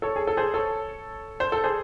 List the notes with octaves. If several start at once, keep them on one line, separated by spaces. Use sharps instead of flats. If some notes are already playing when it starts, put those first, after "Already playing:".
A4 C#5
G#4
A4
G#4 C5
A4 C#5
C5
A4
G#4 C5